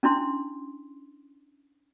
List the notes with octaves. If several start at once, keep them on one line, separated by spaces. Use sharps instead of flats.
C#4 D4 E4 C6